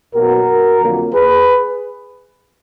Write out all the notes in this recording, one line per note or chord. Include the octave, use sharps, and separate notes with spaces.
B1 B2 F#3 A#3 F#4 A#4
F2 D3 F#3 A#3
G#4 B4